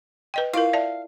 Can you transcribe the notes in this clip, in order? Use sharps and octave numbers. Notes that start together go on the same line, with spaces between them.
B4 D#5 G5
E4 F4 A#4 F5
D5 E5 A5